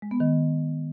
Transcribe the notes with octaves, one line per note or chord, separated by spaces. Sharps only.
G#3
B3
D#3